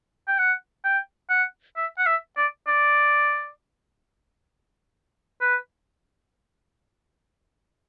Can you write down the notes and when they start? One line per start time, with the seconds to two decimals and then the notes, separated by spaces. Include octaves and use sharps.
0.28 G5
0.39 F#5
0.85 G5
1.30 F#5
1.76 E5
1.99 F#5
2.06 E5
2.37 D5
2.67 D5
5.42 B4